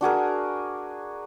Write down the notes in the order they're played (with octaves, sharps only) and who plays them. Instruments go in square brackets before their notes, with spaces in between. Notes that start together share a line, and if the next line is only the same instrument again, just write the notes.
[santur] D4 F#4 G#4 A#4